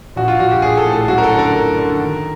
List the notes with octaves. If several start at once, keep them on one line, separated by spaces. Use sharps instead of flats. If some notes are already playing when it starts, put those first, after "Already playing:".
A#1 F#4
F4
A#1 F#4
G4
A#1 G#4
A4
A2
A4
F#2 F#4
A#4
A4
D3
A#4
D3
D3
D#3